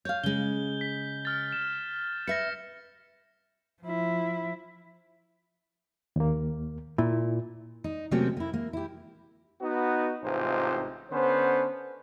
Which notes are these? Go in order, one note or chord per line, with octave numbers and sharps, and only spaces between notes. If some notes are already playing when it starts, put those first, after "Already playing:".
C#5 F5 G6
C#3 G#3 G7
B6
F6 A6
E7
B4 E5 A#6 C#7
F3 E4
D#2 A#3
A#2 E4
D#4
C3 F#3 A3 A#3 C4 C#4
A#3 E4
A#3
E4 G4
B3 D#4 F#4
A1 G#2 C3 D#4 F4 C5
D3 B3 C#4 C5